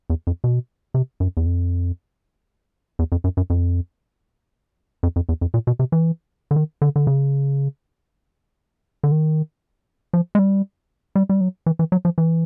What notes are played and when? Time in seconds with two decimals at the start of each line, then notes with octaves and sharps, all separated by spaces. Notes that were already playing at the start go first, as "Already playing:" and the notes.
0.10 E2
0.27 F2
0.44 B2
0.94 C3
1.20 F#2
1.37 E2
1.46 F2
2.99 E2
3.12 F2
3.24 F#2
3.37 F#2
3.50 F2
5.03 F2
5.16 F2
5.29 E2
5.41 F2
5.54 A#2
5.67 B2
5.79 C3
5.92 E3
6.51 D3
6.56 D#3
6.82 D3
6.96 D3
7.07 C#3
9.04 D3
9.11 D#3
10.13 F3
10.35 G#3
10.39 G3
11.16 G3
11.29 G3
11.41 F#3
11.66 E3
11.79 E3
11.92 F#3
12.05 F3
12.18 E3